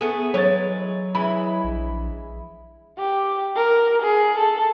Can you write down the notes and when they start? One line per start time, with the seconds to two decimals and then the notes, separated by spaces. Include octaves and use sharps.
0.01 A3 B3 G#4 A4
0.34 E3 F#3 G#3 B4 C#5 A6
1.15 E3 G#3 E4 B5
1.64 A#1
2.99 G4
3.56 A#4
4.02 G#4
4.38 A4